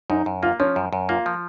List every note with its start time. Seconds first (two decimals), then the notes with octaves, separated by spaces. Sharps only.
0.10 F#2 D#4
0.26 F#2
0.43 A#3 F4
0.60 F3 C#4
0.76 F#2
0.93 F#2
1.09 A#3 F4
1.26 F3